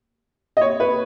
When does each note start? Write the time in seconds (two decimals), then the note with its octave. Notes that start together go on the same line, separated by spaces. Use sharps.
0.57 D#5
0.61 C#5
0.80 B4